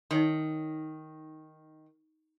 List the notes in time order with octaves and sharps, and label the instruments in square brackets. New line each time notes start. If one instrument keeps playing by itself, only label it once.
[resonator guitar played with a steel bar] D#3 [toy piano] D#4 C#5 C6